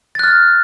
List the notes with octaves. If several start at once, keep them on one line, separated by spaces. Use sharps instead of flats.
F6 F#6 A6